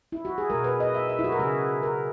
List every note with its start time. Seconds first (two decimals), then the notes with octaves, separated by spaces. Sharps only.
0.12 E4
0.25 F#4
0.38 G#4
0.50 B2 G#3 A#4
0.64 B4
0.80 D#5
0.95 E5
1.09 E5
1.19 E4
1.24 F#4
1.32 A#4
1.39 C#3 G#3 G#4
1.83 A#4